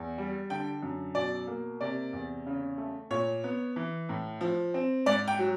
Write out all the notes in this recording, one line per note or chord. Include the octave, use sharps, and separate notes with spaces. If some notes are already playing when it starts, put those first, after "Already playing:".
Already playing: E2
G3
D3 G5
F#2
B2 D5
A#3
C3 D5
E2
C#3
A3
A#2 C#5
B3
E3
A2
F3
C4
G#2 D5
G5
F#3